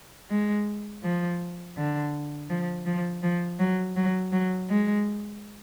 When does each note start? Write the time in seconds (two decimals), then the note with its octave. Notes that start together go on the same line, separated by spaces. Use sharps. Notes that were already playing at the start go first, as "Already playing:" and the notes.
0.30 G#3
1.03 F3
1.77 D3
2.50 F3
2.86 F3
3.23 F3
3.59 F#3
3.96 F#3
4.32 F#3
4.69 G#3